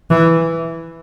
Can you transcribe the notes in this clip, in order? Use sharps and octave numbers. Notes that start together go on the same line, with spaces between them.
E3